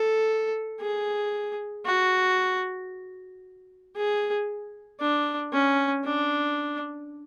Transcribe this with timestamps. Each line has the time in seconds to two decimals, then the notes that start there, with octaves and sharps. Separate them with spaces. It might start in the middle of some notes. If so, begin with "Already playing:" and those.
Already playing: A4
0.81 G#4
1.85 F#4
3.96 G#4
5.00 D4
5.53 C#4
6.05 D4